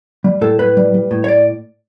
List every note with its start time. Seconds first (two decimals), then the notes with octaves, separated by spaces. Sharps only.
0.24 G3
0.41 A2 A4
0.59 A2 B4
0.77 G3
0.94 G3
1.11 A2
1.24 C#5
1.28 D5